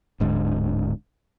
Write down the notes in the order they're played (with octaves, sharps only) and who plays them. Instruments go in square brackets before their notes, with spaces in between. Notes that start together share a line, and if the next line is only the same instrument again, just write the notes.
[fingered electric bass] D1 G#2 D3